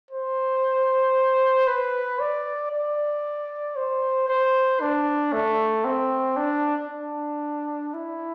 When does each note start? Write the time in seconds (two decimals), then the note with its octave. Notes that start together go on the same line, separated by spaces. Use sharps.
0.11 C5
1.68 B4
2.19 D5
2.72 D5
3.76 C5
4.28 C5
4.81 D4
5.33 A3
5.85 C4
6.37 D4
6.89 D4
7.94 E4